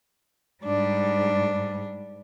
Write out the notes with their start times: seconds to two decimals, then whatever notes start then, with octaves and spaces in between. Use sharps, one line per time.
0.64 G#2 G3 D4